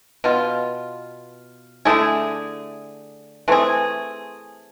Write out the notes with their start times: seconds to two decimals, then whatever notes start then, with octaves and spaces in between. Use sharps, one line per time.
0.24 B2 B3 F4
1.85 D3 A3 E4 G#4
3.48 E3 A3 C4 G#4